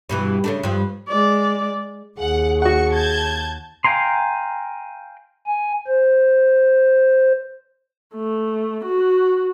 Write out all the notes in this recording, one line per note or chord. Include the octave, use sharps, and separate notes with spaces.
G2 B2 E3
C#3 A3 D4
G2 F3
G#3 D5
D#2 G#4 F#5
F#4 F#5 C#6 C#7
A5 G6 G#6
F5 G5 G#5 A#5 C6
G#5
C5
A3
F#4